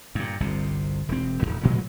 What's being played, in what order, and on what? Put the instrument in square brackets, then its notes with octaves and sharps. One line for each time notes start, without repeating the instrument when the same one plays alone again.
[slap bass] G2 A#2
G1 C2 C3
E1 C4
D#1 F#2
A1 A#2 F#3 G#3